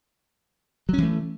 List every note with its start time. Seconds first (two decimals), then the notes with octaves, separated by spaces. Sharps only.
0.89 F#3
0.93 C#4
0.98 E3
1.03 A3